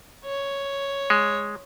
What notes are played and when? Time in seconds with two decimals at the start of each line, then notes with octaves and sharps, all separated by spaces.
0.25 C#5
1.10 G#3